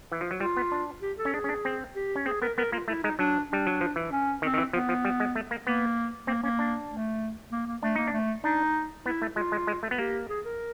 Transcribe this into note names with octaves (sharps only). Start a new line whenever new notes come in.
E3
F3
F#3
G3 F4
B3
D4
G4
A4
C#4
D4 G#4
C#4
D4
C4
G4
C#4
C4 G#4
B3 A#4
B3 A#4
A#3 F4
A3 E4
G#3 D#4
F#3 D4
G3 D4
F#3
F3
E3
C#4
D#3 C4
D#3
E3
F3 B3
F3
G3
G#3
A3
A#3
A#3 B3
A#3 C4
A#3 C#4
D4
A3
A#3
A#3
A3 D4
A#3 D#4
D4
A3
D4 D#4
B3 E4
A3
G#3 F4
G#3
G#3
A3
B3
A#3 G4
G#4
A#4